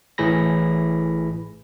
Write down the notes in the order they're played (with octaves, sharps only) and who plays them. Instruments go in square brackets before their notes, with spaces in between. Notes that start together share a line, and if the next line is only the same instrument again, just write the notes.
[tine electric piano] A1 A2 E3 G#4 B5 A#6